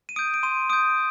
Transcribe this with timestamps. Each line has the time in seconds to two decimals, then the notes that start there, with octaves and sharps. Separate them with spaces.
0.09 D#7
0.16 D#6 G6 D7
0.34 D7
0.43 C6 D#7
0.70 D#6 G6 D7